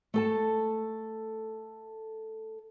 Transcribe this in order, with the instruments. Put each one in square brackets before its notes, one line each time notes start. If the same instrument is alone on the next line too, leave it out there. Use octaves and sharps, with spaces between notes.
[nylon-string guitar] A3 A4 A5